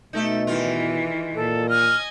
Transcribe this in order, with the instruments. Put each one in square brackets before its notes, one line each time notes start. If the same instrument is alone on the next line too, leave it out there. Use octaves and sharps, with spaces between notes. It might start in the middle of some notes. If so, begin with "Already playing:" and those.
[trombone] B2 [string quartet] A3 [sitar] D#4 A4 E5
[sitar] E2 D#3 F4 [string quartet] E3
[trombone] A#2 [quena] A4
[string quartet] D#5 G#5 [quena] F6